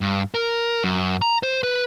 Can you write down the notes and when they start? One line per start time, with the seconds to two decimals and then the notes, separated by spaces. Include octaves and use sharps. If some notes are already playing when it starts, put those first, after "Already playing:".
0.01 G2
0.35 A#4
0.84 F#2
1.22 A#5
1.43 C5
1.63 B4